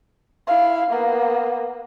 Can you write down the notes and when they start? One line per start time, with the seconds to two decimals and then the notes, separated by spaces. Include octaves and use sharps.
0.47 E4 F5
0.90 A#3 B3